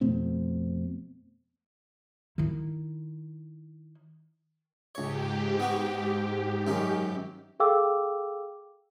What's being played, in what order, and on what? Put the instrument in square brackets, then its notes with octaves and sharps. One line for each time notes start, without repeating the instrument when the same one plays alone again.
[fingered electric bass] F2 B2 A3 C4
[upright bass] D#3 E4
[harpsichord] C#2 C#5 [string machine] G#2 G4
[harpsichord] B3 F#4
F#2 D#3 C#4
[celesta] G#4 A4 F5 G5 D6 E6